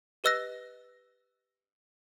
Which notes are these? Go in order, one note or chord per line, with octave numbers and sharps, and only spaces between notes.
G4 B4 D#5 E6 F#6 A#6